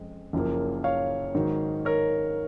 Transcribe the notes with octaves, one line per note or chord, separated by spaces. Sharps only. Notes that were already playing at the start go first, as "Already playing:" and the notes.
Already playing: F2 G#3 C#4
F#1 F#2 F3 A#3
C#5 F5
G#2 D#3 F#3
A#4 C#5